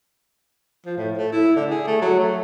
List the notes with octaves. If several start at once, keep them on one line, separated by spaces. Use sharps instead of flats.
F3
A2
A3
E4
D3
G#4
A3
F#3
A3